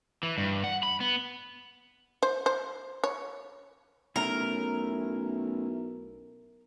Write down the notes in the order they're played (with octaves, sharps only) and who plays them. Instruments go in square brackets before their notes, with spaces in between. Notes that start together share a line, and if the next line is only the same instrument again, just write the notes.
[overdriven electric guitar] E3
G2
F#5
B5
B3
[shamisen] C5
C5
C#5
[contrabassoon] B1 [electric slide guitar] A3 C#4 E4 [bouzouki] A#4